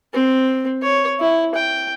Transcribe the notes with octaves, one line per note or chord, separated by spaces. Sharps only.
C4
C#5
E4
G5